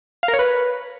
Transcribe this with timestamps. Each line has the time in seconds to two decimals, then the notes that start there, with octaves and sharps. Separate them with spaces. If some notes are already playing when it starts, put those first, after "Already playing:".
0.23 F5
0.28 A#4
0.34 C#5
0.39 B4